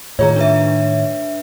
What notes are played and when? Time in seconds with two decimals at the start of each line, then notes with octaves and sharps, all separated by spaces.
0.19 A2 D#3 F4 G#4 C#5 A#5
0.36 D4 B4 E5